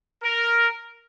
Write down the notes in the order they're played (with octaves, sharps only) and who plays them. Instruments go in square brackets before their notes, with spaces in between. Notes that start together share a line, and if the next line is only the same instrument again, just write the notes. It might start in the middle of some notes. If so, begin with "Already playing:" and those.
[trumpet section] A#4